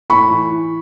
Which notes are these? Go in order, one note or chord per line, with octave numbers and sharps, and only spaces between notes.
A2 B5 C#6
E3
E3